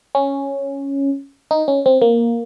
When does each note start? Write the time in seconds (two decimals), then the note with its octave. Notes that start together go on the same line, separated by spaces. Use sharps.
0.15 C#4
1.51 D#4
1.68 C#4
1.86 C4
2.02 A#3